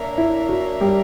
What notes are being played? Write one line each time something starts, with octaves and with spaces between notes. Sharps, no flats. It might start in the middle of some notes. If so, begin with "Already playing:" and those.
Already playing: A#3 D4 A#4 C#5 E5
E4
F#4
G3 G4